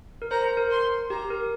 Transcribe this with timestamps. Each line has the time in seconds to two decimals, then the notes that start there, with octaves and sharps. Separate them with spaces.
0.22 A#4
0.31 C5 A#5
0.44 C5
0.57 A#4
0.71 C6
1.10 G4 A#5
1.30 A#4